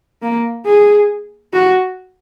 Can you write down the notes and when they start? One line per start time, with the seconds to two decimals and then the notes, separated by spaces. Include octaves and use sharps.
0.22 A#3
0.66 G#4
1.53 F#4